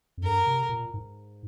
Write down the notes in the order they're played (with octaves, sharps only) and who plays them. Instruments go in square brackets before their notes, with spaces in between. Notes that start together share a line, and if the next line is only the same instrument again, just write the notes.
[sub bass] F2
[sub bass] G2 [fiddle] A#4
[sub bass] C3
A#2
G#2